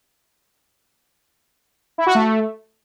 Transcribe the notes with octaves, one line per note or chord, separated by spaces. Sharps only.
E4
F#4
A3